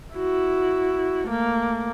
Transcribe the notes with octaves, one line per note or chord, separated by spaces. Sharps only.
E4 F#4
A3 A#3